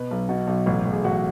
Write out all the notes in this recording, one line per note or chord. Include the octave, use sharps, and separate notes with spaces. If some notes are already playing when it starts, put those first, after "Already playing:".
Already playing: B2 B4
B1
B2 F#4
B1
A1
A1
G#4
A1 F#4